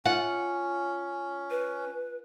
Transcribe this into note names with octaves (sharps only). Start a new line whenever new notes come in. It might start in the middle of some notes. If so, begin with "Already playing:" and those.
C#4 F4 F#5
B4